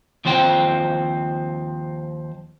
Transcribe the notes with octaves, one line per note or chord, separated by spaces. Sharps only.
D#2 F3 C4 C5 G5